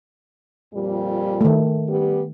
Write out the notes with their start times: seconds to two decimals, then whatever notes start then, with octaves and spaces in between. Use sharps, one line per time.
0.74 F2 A#2 G3
1.41 D#3 A3
1.89 G3 B3 G4